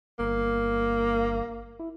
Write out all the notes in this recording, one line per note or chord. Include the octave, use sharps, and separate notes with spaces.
G1 A#3
E4